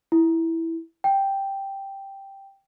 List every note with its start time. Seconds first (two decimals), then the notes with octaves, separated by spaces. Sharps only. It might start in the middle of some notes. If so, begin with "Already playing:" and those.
0.12 E4
1.04 G5